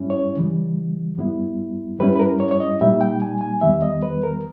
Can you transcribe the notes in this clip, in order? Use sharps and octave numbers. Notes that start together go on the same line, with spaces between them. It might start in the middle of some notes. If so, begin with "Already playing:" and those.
Already playing: G2 G3 C#4 E4
C#5
C#3 E3 G3
G2 G3 B3 E4
G2 G3 C#4 E4 B4
B4
A#4
C#5
C#5
D#5
A#2 G3 A#3 D#4 E5
G5
G#5
G#5
E2 D#3 G3 B3 E5
D#5
B4
A#4